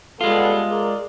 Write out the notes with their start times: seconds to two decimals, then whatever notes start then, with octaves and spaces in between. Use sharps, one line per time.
0.21 G3 G#3 B3 F4 A4
0.70 G#4 A#4 D5